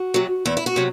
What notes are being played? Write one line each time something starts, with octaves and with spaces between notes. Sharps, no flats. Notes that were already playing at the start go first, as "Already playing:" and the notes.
Already playing: F#4
C3 F#3
E2 E4
E4
F#4
C3 F#3